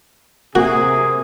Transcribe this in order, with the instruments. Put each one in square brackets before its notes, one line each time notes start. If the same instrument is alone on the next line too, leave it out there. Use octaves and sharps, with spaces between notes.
[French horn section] C3 [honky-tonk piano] A#3 [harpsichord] F#4 [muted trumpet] G#4